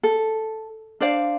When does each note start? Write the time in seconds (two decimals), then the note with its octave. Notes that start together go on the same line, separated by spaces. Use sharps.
0.03 A4
1.00 D4 C5 D5 F5